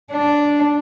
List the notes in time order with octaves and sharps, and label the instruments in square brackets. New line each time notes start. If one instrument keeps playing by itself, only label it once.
[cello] D4